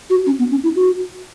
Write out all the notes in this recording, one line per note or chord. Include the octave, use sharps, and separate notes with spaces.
F#4
C#4
B3
C#4
E4
F#4